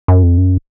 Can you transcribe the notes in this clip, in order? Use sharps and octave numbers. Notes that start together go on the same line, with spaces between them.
F#2
F2
F#2